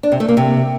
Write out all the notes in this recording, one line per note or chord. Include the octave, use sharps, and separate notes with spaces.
D4
C3
A3
A#3
C3